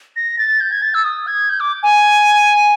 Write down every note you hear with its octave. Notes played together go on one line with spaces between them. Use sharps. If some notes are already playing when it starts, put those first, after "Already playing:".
A#6
A6
G6
G#6
A6
E6
D#6
G#6
G6
D6
G#5